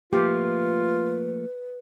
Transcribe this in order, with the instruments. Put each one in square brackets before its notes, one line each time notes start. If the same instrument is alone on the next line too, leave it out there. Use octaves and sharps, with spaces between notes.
[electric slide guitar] F3 A3 A#3 [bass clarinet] F4 [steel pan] G4 [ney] B4